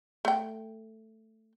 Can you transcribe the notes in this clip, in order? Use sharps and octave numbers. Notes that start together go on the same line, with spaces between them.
A3 G5